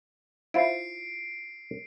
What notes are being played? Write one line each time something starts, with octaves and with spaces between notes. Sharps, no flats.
E4 F4 C5 C7 D7